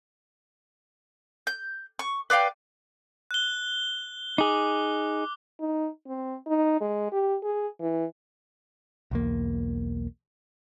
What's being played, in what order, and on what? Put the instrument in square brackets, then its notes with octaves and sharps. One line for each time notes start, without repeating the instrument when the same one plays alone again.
[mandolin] G6
C#6
B4 D5 F5 G5
[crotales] F#6 G7
[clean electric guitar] D#4 G#4 [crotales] D6
[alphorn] D#4
C4
D#4
G#3
G4
G#4
E3
[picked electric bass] B1 E2 A#3